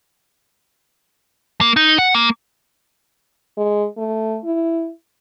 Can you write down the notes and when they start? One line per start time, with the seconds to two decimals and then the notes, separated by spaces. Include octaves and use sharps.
1.61 A#3
1.76 D#4
1.98 F#5
2.15 A#3
3.57 G#3
3.97 A3
4.44 E4